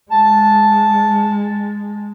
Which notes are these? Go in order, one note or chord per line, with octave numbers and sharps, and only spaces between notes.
G#3 A5